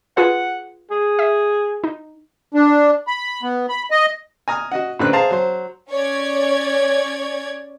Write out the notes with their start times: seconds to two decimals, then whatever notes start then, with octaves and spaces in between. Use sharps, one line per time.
0.17 F4 G#4 B4 F#5
0.91 G#4
1.19 E5
1.84 D#4
2.54 D4
3.07 B5
3.43 B3
3.69 B5
3.91 D#5
4.48 G#5 A#5 D#6 F6
4.72 F#4 D#5 F#5
4.99 A1 F#2 D3 C4 B4 F#6
5.13 G#4 C5 F5 A5 A#5
5.31 F#3 C5
5.90 C#4 C#5 D5 G#6